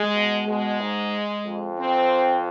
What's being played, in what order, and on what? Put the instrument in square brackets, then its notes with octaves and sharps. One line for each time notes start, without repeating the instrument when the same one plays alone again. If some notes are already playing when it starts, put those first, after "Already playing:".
Already playing: [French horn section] G#3
[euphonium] B2
[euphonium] B2 [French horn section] G#3
[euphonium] G#2
F2
[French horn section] C4